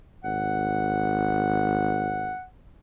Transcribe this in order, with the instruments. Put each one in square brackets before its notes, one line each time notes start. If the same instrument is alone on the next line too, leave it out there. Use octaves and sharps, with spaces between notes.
[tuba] G#1 [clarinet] F#5